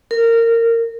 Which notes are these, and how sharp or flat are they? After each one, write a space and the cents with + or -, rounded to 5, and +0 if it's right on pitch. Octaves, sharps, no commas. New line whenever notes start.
A#4 -20